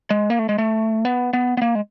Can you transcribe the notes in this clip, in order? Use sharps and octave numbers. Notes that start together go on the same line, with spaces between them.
G#3
A#3
A3
G#3
A3
B3
B3
B3
A#3
G#3